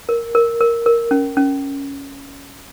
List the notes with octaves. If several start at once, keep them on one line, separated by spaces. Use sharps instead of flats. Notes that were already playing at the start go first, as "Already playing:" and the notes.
A#4
A#4
A#4
A#4
C#4
C#4